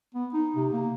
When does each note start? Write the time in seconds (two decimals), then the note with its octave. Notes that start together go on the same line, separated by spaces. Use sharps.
0.15 B3
0.34 D#4
0.56 C3
0.73 A#3